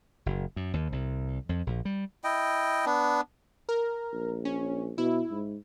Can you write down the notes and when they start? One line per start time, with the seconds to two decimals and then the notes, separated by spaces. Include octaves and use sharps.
0.26 F#1
0.56 F#2
0.73 D#2
0.92 C2
1.49 F2
1.67 A#1
1.85 G3
2.24 E4 D#5 G5
2.86 B3 D4
3.69 A#4
4.13 A#1
4.45 C#4
4.98 B2 E4
5.31 G#2